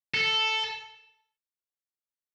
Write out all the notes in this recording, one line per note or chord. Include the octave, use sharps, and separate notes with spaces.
A4